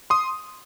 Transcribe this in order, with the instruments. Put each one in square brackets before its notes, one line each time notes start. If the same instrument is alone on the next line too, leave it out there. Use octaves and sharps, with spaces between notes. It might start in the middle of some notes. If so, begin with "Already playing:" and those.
[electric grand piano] C6 D#6